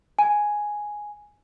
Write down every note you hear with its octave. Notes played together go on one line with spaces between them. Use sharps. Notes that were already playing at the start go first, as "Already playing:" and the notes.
G#5